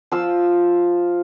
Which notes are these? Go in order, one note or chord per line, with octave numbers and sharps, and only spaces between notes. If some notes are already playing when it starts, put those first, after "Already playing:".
F3 F4 E6